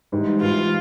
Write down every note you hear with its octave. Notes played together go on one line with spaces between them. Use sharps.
G#2 E3 G3
G#2 E3 G3 F4